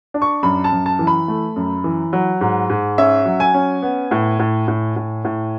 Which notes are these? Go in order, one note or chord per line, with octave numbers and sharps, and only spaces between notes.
D4
C#6
F#2 B5
A5
F#2
A5
E3
B5
A3
F#2
E3
F#3
G#2
G#2
C#4 E5
F#3
G#5
C#4
B3
A2
A2
A2
A2
A2